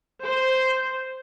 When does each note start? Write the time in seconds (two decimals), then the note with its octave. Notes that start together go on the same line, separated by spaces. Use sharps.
0.21 C5